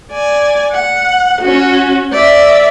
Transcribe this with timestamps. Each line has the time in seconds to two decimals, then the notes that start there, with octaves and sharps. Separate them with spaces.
0.11 D5 G#5
0.71 F#5
1.41 C#4 F#4
2.12 D5 E5